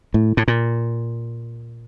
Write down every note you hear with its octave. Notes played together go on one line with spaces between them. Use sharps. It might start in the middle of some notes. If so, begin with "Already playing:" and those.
A2
A2
A#2